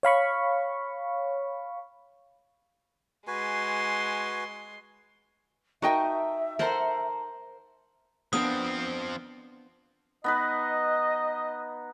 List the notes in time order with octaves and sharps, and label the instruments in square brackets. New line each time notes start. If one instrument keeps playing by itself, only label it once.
[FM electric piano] C#5 F5 B5 C#6
[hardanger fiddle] G#3 C6 [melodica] F#4 B4 G#5
[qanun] D#4 [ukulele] F#4 D#5 G5 [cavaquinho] A#4 A5 C#6 [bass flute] E5
[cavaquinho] A4 A#5 C6 [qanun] A#4 C5 F#5
[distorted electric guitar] F3 C4 [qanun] B3 D4 A#4 [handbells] D#6
[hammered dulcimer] B3 D#4 B4 [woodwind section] D#5